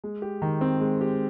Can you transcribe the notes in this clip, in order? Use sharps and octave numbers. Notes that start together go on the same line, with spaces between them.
G#3
G4
D#3
C4
G#3
G4